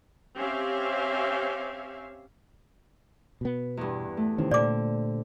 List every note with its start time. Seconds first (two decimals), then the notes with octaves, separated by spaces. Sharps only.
0.37 C4 C#4 G4 E5 F5
3.41 B2 B3
3.77 E2 G2
4.17 A3
4.38 C3 D#3 E3 C#4
4.51 A#2 D3 C4 D5 D6